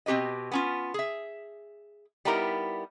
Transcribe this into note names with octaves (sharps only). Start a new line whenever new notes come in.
B2 C4 G4 B4 D#5
B3 C#4 F4
G#4 E5
G3 B3 D#4 E4 G4 A#4